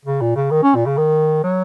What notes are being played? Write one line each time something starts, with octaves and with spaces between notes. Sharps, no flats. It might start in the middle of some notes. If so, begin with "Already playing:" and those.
C#3
A#2
C#3
D#3
C#4
A#2
C#3
D#3
F#3